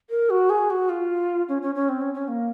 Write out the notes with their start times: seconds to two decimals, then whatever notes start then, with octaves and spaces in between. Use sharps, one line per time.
0.10 A#4
0.30 F#4
0.50 G#4
0.70 F#4
0.89 F4
1.49 C#4
1.62 C#4
1.75 C#4
1.89 C4
2.01 C#4
2.14 C#4
2.28 A#3